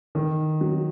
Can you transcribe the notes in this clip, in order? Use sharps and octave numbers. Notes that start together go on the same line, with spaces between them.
D#3
F#3